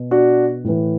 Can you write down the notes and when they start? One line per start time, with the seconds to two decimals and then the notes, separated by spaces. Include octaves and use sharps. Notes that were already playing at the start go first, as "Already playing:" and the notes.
Already playing: B2
0.11 D4 F#4
0.64 A2 E3